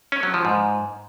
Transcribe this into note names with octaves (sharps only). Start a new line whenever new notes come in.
C#4
F#3
F3
G#2